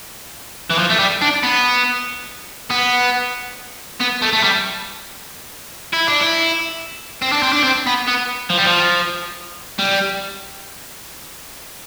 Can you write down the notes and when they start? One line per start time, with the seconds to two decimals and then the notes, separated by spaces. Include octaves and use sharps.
0.70 E3
0.79 F3
0.90 A3
0.99 G3
1.22 D4
1.43 B3
2.71 B3
4.00 B3
4.22 A3
4.33 A3
4.43 G3
5.93 E4
6.07 D4
6.20 E4
7.22 C4
7.32 D4
7.43 C4
7.53 D4
7.63 C4
7.86 B3
8.07 B3
8.50 F3
8.58 G3
8.65 F3
9.79 G3